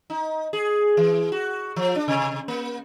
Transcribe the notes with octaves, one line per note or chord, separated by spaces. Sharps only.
D#4
G#4
E3
F#4
F3
D4
C3
A#3